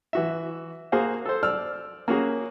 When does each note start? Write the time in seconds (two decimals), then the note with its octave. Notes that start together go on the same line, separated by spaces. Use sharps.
0.13 E3 F#4 E5
0.92 A#3 F#4 G#4 C5 F5
1.26 A4 C5
1.43 D5 E6 F6
2.08 A#3 C#4 F#4 G#4